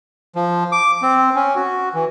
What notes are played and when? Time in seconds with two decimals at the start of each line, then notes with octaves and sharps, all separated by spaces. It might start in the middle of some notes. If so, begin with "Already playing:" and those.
0.36 F3
0.72 D6
1.02 C4
1.35 C#4
1.55 F#4
1.94 E3